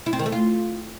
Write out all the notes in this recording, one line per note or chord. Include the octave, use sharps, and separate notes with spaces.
E4
C4
D#3
A3
F4